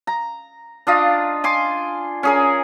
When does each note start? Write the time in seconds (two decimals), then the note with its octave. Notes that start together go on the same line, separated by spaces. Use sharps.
0.07 A#5
0.87 D4 F4 D#5 F5
1.44 G#5 C6 D6
2.23 C#4 G#4 A#4